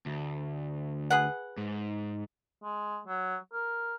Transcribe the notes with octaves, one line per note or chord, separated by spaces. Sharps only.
D2
G#4 B4 F#5
G#2
G#3
F#3
A#4